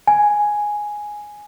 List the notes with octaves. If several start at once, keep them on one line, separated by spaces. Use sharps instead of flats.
G#5